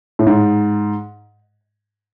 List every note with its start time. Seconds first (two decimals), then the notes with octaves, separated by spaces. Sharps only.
0.19 A2
0.27 G#2